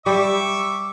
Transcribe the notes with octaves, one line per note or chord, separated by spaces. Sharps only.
G3 E5 C#6 D6